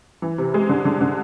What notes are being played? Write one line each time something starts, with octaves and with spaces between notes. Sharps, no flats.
E3
C3
G#3
D3
D3
D3